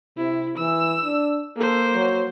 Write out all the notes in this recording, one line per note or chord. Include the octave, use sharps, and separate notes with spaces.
C3 E4
E3 E6
D4
A#3 A4 C5
F#3